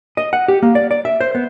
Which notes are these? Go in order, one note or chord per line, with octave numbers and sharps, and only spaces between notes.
D#5
F#5
G4
A#3
D5
D5
E5
C5
B3